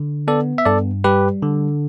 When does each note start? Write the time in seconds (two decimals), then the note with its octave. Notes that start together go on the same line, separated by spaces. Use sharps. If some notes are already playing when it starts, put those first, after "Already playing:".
Already playing: D3
0.28 B3 A4 D5
0.58 E5
0.66 G2 A4 D5
1.04 G3 G4 B4
1.42 D3